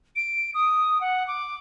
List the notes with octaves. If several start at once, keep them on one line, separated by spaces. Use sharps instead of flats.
D7
D#6
F#5
D6